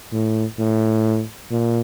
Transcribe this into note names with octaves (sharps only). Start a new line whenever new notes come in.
A2
A2
A#2